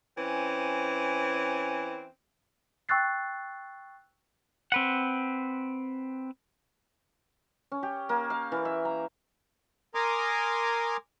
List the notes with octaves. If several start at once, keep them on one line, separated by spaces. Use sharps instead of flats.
E3 C4 C#4
G5 C#6 E6 F#6 A6 C7
C4 B4 F#5
C#4
G4
A#3
F5
E3
E5
A#5
A#4 G#5 A#5 C6 D6 D#6